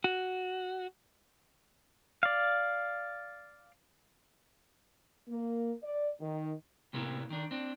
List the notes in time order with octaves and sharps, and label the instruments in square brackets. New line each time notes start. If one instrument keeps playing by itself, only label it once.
[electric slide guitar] F#4
[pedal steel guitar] D5 F5
[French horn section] A#3
D5
D#3
[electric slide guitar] A2 C3 A#3 B3 E4
D#3 D4
C4 D4